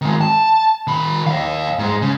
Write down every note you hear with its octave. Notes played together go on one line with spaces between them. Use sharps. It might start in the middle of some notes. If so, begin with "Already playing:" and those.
D#3 G#3
A5
D#3 B5
D#5 F5
G#2 G#3
C#3